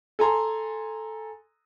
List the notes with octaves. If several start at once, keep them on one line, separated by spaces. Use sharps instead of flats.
A4 G#5 A#5 C6